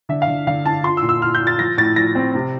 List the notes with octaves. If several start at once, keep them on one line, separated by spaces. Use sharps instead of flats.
D3 E5
F5
D3
D3 F5
D4 A5
F4 C6
E6
A#2
E6
F4 F6
G6
F4
A6
F3 A#6
A2 A6
F3 A#6
C4
C3